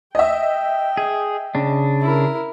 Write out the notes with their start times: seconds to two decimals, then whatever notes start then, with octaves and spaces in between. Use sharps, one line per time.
0.15 D#5 E5 G5
0.97 G#4
1.55 C#3 D4
2.00 E4 A#4